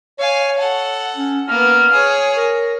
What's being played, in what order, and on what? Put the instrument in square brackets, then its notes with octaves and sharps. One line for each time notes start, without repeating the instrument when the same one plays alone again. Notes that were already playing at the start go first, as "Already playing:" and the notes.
[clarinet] C#5 [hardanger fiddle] F5 G#5
[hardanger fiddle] A4 F#5
[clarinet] C#4
[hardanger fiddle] A#3 B3 [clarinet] F6
[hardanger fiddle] G#4 C#5
[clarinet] A#4